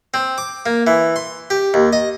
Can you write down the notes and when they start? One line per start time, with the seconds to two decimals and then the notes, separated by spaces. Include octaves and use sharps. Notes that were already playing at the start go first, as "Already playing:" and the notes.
0.14 C4
0.38 D6
0.66 A#3
0.87 E3
1.16 C6
1.50 G4
1.74 D#2
1.93 D#5